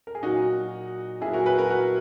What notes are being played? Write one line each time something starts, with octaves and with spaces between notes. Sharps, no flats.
A#4
G#4
A#2 F#3 D#4 F#4
A#2 F#3 E4 G#4
F#4 A#4
G#4 B4
F#4 A#4
F#4 A#4